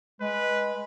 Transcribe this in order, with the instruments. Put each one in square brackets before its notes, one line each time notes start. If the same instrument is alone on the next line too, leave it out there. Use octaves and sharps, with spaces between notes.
[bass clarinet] G#3 [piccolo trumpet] B4